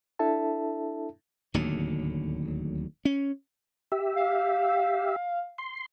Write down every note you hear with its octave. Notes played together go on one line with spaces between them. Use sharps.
D4 E4 A4 E5 A5
D1 D#2 D3 F#3
C#4
G4 E5
F5
C6